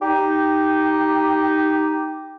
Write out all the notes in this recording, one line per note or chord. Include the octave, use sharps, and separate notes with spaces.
D#4 G4